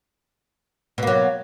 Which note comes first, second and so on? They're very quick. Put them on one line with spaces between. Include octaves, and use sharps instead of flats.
B2 A#3 F#3